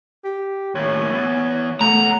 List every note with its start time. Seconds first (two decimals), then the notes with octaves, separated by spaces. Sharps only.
0.24 G4
0.75 D#2 A2 C#5
1.11 E3 B3
1.81 C#2 A3 F#5 A#5